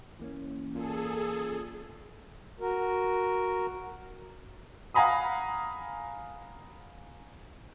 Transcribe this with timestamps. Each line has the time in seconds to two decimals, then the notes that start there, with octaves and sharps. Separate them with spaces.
0.19 E3 A#3 C#4
0.74 A#2 G#4 A4
2.60 F#4 A#4
4.94 F5 F#5 G#5 A#5 B5 D#6